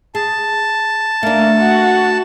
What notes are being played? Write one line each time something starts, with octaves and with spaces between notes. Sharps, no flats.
G#4 A5
A3 A#3 D4
F#4